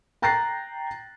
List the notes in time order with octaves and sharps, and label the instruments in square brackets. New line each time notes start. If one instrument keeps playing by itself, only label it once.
[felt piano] G5 A#5 F#6 A6 A#6 C7